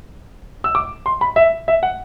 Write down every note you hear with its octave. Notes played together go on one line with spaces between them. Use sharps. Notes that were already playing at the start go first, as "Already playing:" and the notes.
E6
D6
C6
B5
E5
E5
F#5